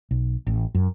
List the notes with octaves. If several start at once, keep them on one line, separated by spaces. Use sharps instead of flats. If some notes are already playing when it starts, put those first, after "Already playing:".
B1
A1
F#2